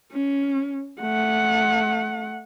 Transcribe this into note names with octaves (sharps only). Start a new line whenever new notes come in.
C#4
A3 F#5